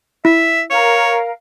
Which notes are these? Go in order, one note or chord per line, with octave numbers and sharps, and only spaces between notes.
E4 E5
A#4 C#5 F5